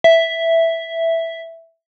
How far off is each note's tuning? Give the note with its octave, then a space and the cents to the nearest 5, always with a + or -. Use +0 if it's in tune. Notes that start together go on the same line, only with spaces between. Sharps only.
E5 +0